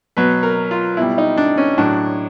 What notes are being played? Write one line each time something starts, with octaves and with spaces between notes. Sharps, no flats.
B2 F#3 B4
A#4
F4
B2 G3 E4
D#4
D4
C#4
A2 F#3 D4